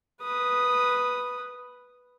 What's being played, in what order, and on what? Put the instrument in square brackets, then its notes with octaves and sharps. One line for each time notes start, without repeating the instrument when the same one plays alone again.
[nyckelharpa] B4 D#6